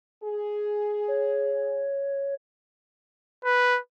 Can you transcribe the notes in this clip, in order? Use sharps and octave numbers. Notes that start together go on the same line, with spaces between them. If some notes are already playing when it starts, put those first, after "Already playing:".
G#4
C#5
B4